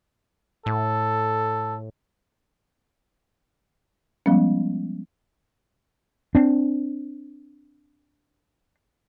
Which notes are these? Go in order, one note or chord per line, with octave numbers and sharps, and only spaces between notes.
A2 A4
F3 G3 G#3 B3 C#4
C4 D4